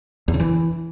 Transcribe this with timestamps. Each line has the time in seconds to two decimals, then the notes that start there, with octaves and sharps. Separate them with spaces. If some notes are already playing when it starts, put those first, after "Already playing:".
0.28 E2
0.34 C#3
0.40 E3